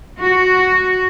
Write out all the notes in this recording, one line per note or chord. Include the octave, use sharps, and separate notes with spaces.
F#4